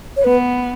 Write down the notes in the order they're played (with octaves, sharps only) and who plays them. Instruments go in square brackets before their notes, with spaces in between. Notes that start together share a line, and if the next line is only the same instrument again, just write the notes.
[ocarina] C#5
[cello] B3 [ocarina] B4